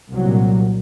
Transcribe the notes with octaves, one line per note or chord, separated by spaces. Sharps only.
C2 A#2 F#3